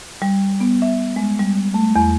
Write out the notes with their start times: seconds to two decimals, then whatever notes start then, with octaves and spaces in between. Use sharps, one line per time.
0.22 G3
0.60 B3
0.82 E5
1.16 G#3
1.40 G3
1.74 A3
1.96 E2